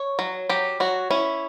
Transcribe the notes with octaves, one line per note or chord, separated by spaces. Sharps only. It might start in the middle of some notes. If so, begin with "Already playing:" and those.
Already playing: C#5
F#3
F#3 G4
F#3 F#4
C#4 E4